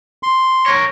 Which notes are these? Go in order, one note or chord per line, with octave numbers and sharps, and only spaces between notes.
C6
A#4 C#5